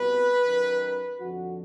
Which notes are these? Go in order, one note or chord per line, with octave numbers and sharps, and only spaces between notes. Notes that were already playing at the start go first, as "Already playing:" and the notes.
Already playing: C2 B2 B4
F#2 D#3
F2 D3 F3 F#4